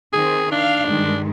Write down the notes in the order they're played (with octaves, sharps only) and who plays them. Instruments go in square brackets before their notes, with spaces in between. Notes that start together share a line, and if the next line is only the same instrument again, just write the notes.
[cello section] D#3 C4 [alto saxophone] G#4
[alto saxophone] D4 [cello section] F5
[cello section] G2 D#3 G#3